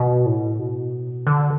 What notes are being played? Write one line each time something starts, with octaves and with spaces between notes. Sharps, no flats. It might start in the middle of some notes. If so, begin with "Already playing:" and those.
Already playing: B2
A2
B2
D3